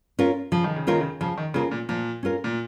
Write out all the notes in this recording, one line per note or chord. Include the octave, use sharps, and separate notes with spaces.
C#4 F4 A#4
C#3 F3
D#3
C#3
D#3 C#4 F4 A#4
C#3
C#3 F3
D#3
C#3 C#4 F4 A#4
A#2
A#2 F3
C#4 F4 A#4
A#2